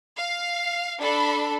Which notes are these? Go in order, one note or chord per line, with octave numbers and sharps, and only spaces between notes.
F5
D4 A4 B5